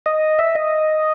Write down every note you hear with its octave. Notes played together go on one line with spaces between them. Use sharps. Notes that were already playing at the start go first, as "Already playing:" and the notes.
D#5
E5
D#5